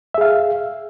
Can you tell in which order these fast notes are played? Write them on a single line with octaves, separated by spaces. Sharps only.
E5 G#4 F5